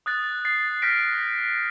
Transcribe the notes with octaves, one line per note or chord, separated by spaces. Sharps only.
D#6 F#6 A6
A6 C7
F6 G6 A#6 B6 D7